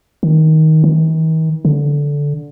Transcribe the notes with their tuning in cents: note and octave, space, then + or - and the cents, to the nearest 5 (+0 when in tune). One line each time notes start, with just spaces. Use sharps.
D#3 +15
D#3 +45
D3 -15